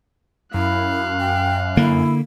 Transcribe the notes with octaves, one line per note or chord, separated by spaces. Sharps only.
F#2 E4 F5 F#6
G5
D3 A#3 E4